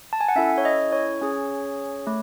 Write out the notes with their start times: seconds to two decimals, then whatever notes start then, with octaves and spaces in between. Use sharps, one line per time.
0.13 A5
0.21 G#5
0.28 F#5
0.35 C#4 E4 A4 E5
0.58 C#5
0.65 D#5
0.93 C#5
1.22 C#4 G#4
2.07 A3